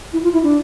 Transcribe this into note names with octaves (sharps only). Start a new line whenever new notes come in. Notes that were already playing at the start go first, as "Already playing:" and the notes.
E4
F4
E4
D4